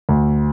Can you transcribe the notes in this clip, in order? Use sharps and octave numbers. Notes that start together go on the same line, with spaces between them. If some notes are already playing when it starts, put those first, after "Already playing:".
D2